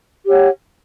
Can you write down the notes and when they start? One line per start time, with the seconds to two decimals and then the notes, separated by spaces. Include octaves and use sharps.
0.25 G4
0.28 C#5
0.31 F#5